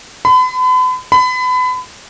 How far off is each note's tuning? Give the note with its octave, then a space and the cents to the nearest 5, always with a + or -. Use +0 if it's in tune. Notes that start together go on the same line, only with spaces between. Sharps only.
B5 +40
B5 +30